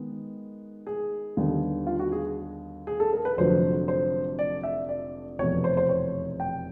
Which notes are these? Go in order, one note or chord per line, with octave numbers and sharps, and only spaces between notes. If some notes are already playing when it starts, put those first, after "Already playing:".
Already playing: D#3 G#3 B3
G#4
D#2 D3 G3 B3
F4
F#4
G#4
G#4
A4
A#4
B4
F1 F2 D3 F#3 C5
C5
D5
E5
D5
F1 E2 B2 C#5
C5
C5
C#5
G5